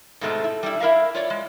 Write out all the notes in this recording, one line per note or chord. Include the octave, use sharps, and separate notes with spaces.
G#2 B2 G#3 A3 C4
E4
G3 D4 E4
E4 A#4 E5 F5
F4 C#5 D5
G#3